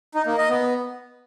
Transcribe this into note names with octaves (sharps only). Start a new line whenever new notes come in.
D#4
A#3
D#5
B3